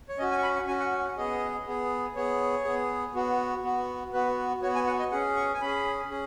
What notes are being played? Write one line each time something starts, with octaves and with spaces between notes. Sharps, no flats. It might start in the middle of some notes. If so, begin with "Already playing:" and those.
C#5
C#4 F#4 D#5
G#5
C#6
B5
C#6
C#4 F#4 G#5
F#5
F#5
F#5
B3 G#4 D#5
B3 G#4
B3 G#4 C#5
B3 G#4
B3 F#4
B3 F#4
B3 F#4 B4
B3 F#4 C#5
G#5
F#5
D#5
C#4 G#4 F#5
C#6
G#5
C#4 G#4 B5
C#4 G#4